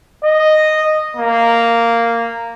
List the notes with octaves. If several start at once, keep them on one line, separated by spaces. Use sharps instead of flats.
D#5
A#3